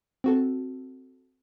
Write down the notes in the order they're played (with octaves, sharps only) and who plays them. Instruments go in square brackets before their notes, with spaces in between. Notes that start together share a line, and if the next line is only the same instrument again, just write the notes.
[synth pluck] C4 F#4 A4